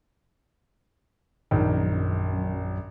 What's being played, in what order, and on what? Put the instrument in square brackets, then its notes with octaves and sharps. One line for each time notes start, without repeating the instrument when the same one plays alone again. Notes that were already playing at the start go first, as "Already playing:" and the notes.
[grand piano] A#1 D#3 [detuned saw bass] F#2